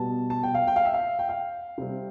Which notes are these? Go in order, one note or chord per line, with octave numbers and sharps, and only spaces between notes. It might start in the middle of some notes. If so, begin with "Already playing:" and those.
Already playing: B2 G3 B3 A5
A5
G5
F5
G5
F5
E5
F5
G5
F5
C3 G3 C4